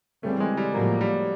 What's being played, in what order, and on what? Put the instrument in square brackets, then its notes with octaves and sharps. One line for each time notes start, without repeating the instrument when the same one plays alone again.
[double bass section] C#3 E3 G3 C4 [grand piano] A3
[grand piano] G#3
G3
[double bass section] A2 F3 A#3 [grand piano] F#3
[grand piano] G3